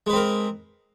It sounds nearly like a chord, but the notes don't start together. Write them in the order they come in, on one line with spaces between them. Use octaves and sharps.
G#3 B4 C4 A#4